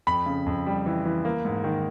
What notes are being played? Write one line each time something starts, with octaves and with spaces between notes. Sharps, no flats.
F2 B5
C#3
F2
G3
E3
E3
A#3
G#2
D#3